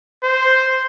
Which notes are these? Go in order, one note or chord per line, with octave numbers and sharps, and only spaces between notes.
C5